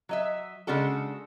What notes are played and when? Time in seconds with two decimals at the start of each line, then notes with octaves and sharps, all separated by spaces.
0.09 F#3 D#5 E5
0.67 C#3 G#3 D4 F#4 A4